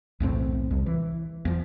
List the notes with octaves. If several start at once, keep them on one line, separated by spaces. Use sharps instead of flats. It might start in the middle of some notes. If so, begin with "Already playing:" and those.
B1 E2 A2 C4
C2
E3
E2 F3